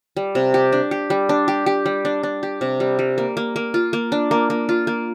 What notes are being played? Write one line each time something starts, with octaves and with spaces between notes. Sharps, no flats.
G3
C3
G4
D4
G4
G3
D4
G4
G4
G3
D4
D4
G4
C3
G3
G3
A#3
A#3
A#3
F4
A#3
D4
A#3
A#3
F4
A#3